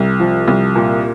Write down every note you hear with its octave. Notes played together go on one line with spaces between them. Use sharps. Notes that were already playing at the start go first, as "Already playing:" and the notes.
Already playing: C2
F3
C2
A#2